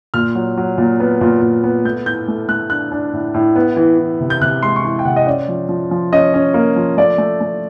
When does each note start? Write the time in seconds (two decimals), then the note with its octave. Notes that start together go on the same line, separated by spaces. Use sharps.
0.14 A#2 F6
0.35 F#3
0.58 F#3
0.78 A#2
1.00 B3
1.21 A#2
1.42 A#2
1.63 B3
1.84 A3 G6
2.06 A2 G6
2.28 A3
2.49 A3 F#6
2.70 D4 F#6
2.92 D4
3.13 A2
3.34 A2
3.56 B3
3.77 E3
3.98 E3
4.20 C3
4.30 G6
4.42 C3 F#6
4.63 G#3 C6
4.76 C#6
4.84 E3 C6
4.99 G5
5.05 C3 F#5
5.16 D#5
5.27 C#4 D5
5.49 F3
5.69 F3
5.91 F3
6.13 C#4 D#5
6.34 C#4
6.54 A#3
6.76 F3
6.97 A3 D5
7.18 A3
7.41 A3